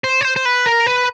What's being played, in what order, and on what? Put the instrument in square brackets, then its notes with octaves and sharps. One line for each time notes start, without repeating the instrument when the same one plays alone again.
[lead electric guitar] C5
C#5
C5
C5
B4
A#4
B4